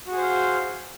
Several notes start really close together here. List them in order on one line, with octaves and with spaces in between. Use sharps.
F#4 G#4 C5 F5